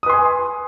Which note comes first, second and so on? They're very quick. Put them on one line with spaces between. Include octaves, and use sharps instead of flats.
D#6 B4 C6 G#5